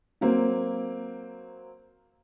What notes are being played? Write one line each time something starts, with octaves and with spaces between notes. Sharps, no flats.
F#3 A#3 C4